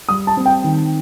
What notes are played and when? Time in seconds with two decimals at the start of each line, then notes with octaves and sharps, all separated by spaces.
0.09 G3 D#6
0.27 A5
0.37 C4
0.46 G5
0.64 D#3